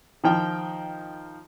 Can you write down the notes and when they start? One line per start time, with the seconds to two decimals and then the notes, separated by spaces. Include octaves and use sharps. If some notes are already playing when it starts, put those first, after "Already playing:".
0.24 D#3 F3 G5 F6